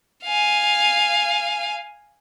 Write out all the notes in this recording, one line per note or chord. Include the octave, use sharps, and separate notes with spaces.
F5 G#5